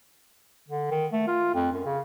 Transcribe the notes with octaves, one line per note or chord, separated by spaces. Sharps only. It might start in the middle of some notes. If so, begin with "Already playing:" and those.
D3
D#3
A3
F4
F2
F#2
C#3